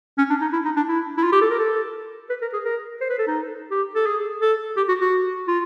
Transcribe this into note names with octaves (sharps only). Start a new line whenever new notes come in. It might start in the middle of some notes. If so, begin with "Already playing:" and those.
C#4
D4
D#4
E4
D#4
D4
E4
E4
F4
G4
A4
A#4
A4
B4
A#4
G#4
A#4
C5
B4
A4
D#4
G4
A4
G#4
A4
G4
F#4
F#4
F4